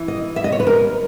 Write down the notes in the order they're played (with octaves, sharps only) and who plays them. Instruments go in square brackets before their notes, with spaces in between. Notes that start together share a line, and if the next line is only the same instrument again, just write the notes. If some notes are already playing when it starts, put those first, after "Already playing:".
Already playing: [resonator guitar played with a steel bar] E3
[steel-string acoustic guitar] D#5
E5
D#5
C#5
B4
A#4